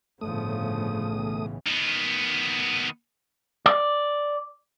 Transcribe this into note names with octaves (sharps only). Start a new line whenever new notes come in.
G1 A2 C#3 F3 A3 D#6
B1 E3
D#3 B3
D5